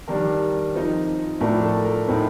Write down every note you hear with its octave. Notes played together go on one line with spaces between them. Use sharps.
D#3 G3 D4 A#4
F3 C4 D#4
A2 F3 A3 D4 A#4
A4
A#4
A2 A3 C4 D#4